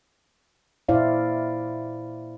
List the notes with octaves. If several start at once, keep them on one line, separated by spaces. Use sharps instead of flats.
A#2 E4 C5 D5 F5